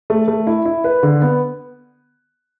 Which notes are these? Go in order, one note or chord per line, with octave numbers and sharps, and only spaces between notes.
A3
A3
E4
E4
B4
D3
B3